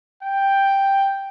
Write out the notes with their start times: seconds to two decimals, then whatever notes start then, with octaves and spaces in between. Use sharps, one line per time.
0.22 G5